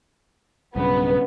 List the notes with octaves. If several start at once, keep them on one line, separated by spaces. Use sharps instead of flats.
B1 G2 C#3 B3